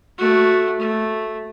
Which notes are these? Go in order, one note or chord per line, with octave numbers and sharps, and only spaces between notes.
A3 F#4
A3